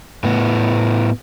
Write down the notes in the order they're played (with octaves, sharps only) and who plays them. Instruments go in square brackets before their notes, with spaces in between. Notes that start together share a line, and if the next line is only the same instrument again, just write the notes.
[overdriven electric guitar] A2 B3